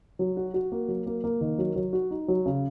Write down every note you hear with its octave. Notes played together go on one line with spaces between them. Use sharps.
F#3
F#4
F#4
A#3
F#3
A#3
A#3
D#3
F#3
F#3
F#4
D#4
F#3
C#3